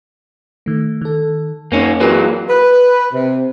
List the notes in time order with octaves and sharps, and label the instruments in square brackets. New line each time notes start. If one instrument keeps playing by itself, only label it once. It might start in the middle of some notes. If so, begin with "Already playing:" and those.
[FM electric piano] D#3 A3
D#3 A4
[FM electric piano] F#2 D#4 [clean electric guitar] A#3 C#4
[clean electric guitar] E3 F#3 A#3 [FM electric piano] G#4 A#4 B4
[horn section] B4
C3